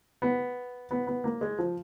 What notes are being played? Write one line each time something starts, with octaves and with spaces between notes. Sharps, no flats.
B3
B3
B3
A#3
G#3
F3